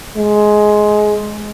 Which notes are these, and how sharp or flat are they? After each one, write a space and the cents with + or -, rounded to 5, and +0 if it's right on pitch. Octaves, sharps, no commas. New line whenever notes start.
G#3 +15